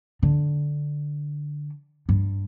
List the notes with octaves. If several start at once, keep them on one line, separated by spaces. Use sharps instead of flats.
D3
G2